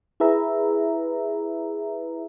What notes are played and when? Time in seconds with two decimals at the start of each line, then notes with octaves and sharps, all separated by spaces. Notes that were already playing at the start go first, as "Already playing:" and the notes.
0.20 E4 G#4 B4 E5 A#5